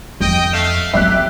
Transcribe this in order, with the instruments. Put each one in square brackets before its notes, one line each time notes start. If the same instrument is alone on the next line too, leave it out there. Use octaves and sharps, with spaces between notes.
[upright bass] F2 [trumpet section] D#5 G5
[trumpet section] A3 F5 [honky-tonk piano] E7
[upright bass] F#3 C4 [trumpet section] G4 [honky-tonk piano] E5 F#6